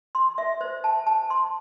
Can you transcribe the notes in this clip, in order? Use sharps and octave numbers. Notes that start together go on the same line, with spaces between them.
C6
E5
C5
A5
A5
C6